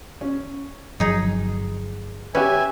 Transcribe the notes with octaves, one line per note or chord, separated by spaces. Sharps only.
C#4
G1 F3 F#3 D#4 G#4
C#4 G4 B4 E5 G#5